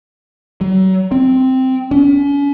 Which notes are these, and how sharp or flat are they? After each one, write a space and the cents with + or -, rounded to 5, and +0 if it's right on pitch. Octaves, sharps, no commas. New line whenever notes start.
F#3 +35
C4 -5
C#4 +40